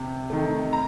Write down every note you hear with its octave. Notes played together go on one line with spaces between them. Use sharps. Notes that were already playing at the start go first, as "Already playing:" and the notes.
Already playing: C3
D#3 A3
A#5